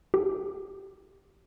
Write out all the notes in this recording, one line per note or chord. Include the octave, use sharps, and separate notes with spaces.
G4